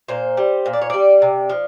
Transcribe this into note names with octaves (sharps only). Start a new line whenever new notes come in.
A#2 C5
G3
A#2
D5
C#5
G3 D5
C3
F3